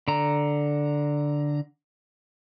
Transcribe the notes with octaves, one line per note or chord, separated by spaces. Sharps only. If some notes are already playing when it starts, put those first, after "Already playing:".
D3 A#5